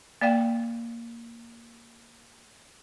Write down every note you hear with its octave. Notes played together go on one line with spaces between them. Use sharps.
A#3 D5 F5 G5